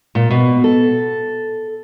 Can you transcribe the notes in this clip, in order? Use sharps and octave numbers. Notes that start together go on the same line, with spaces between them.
A#2
B2
A4